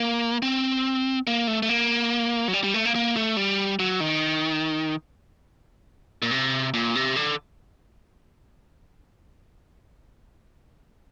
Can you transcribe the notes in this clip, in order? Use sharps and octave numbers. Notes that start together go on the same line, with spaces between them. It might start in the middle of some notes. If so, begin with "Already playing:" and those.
Already playing: A#3
C4
A#3
A3
A3
A#3
F#3
G3
G3
A3
A#3
A#3
A3
G3
F#3
D#3
A#2
C3
A#2
C3
D3